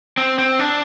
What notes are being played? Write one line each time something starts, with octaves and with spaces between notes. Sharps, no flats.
C4
C4
D4